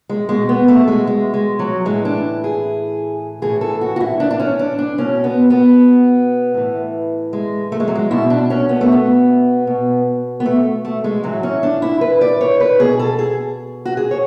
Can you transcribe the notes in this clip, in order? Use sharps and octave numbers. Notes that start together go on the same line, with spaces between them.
G#3
B2 G#3
B3
A3
G#3
G#3
G#3
F#3
A2 E3 G#3
D4
G#4
A2 E3 G#4
A4
F#4
F#4
E4
D4
D4
C#4
D4
D4
B2 C#4
B3
B3
A2 E3
G#3
A3
G#3
F#3
G#3
B2 E4
D4
C#4
B3
A3
B3
B2
B3
A3
A3
G#3
A2 E3 F#3
C#4
D4
E4
B4
D5
C#5
B4
B2 G#4
A4
G#4
F#4
G#4
C#5